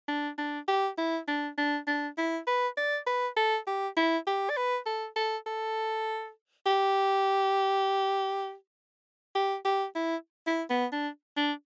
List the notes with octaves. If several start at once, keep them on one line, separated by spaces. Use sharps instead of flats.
D4
D4
G4
E4
D4
D4
D4
E4
B4
D5
B4
A4
G4
E4
G4
D5
B4
A4
A4
A4
G4
G4
G4
E4
E4
B3
D4
D4